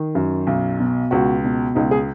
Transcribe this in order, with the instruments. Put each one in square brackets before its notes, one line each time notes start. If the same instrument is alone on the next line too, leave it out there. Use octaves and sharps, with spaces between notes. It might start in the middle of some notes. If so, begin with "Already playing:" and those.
Already playing: [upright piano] D#3
F#2
B1
B2
C#2 F#4
B2
C#2 D#4
G#4